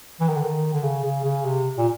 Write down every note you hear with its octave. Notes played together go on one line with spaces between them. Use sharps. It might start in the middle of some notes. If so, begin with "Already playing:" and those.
E3
D#3
D3
D#3
D3
C#3
C#3
C#3
C3
A#2